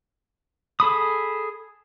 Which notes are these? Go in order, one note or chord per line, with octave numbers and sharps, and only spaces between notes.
G#4 A4 B5 D#6